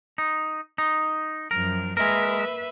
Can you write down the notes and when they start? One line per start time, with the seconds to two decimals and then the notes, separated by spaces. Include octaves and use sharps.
0.18 D#4
0.78 D#4
1.51 F#2 F3 A#4
1.97 G#3 A#3 A#4 B4 E5